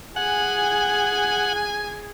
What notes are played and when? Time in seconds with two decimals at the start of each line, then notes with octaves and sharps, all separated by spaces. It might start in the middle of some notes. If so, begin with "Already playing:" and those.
0.16 G#4 F#5 G#5